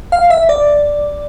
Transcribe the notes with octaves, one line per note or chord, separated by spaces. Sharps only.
F5
E5
D5